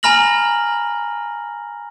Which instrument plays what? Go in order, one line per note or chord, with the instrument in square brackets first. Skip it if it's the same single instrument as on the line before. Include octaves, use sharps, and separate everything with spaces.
[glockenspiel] G#5 A#5 B5 F6 A#6 F#7